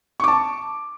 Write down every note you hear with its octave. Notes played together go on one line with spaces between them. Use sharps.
A5 C#6 D6